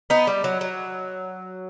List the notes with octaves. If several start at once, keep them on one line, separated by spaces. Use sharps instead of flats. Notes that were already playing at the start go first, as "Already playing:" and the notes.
B3 D#4
G3
F#3
F#3